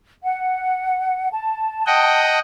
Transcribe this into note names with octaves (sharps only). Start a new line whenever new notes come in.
F#5
A5
D#5 F#5 G5